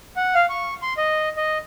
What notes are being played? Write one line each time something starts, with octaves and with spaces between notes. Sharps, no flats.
F#5
F5
C#6
C6
D#5
D#5